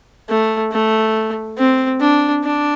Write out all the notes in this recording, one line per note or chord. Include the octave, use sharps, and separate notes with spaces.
A3
A3
C4
D4
D4